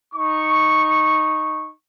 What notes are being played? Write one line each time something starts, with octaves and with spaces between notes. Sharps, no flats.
D#4 C#6